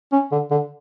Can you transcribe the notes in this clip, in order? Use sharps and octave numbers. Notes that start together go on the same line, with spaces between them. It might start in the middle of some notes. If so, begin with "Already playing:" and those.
C#4
D3
D3